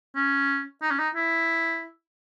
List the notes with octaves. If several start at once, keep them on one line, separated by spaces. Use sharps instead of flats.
C#4
D#4
C#4
D#4
E4